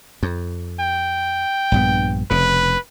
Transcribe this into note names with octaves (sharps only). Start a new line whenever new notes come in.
F2
G5
A#1 G2 B3
F1 C#3 B4